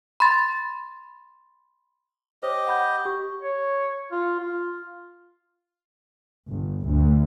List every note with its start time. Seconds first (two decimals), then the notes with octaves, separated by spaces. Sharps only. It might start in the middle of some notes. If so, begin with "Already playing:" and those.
0.20 B5 C6 A6
2.43 G4 C5 C#5 D#5
2.67 F#5 B5 G6
3.05 G4 C#6
3.42 C#5
4.11 F4
4.40 F4
6.50 G1
6.85 D2